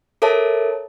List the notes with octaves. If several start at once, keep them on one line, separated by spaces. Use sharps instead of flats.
A4 A#4 C#5 E5 A5